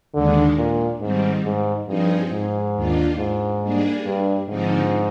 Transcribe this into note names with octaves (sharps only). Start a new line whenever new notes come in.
D#2 D3 D#3 G#3 D4
A#2
G#2 D#3 G3 C4
G#2
G2 F3 C4 D#4 G#4
G#2
D#2 D#3 A#3 D4 F4
G#2
G3 A#3 D4 G#4
G2
G#2 D3 F3 C4 D#4